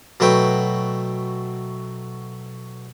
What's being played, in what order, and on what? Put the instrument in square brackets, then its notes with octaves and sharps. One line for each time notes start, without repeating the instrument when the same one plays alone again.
[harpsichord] B2 F#3 A3 B4 G5